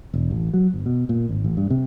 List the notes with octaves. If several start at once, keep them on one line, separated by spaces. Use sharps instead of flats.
E1
A1
F#3
G1
B2
A#2
G#1
A1
G2
C3